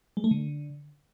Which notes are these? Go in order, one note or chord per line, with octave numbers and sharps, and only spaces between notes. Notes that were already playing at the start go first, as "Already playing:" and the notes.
G#3
A3
D3